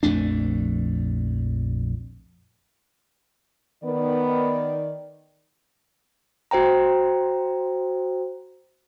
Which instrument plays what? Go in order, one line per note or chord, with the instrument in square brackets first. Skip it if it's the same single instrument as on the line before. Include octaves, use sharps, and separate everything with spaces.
[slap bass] A#1 F2 A3 D4
[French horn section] D#3 D5 [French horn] B3
[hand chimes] F#4 C5 G5 A#5